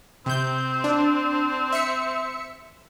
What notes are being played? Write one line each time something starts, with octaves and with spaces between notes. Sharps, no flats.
C3 C4 G6
D4
E5 C#7